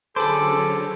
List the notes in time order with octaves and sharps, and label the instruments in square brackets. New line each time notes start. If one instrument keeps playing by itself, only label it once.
[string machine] D3 F#3 C#4 [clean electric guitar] G#4 B4 C5 [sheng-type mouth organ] A4 [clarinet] D6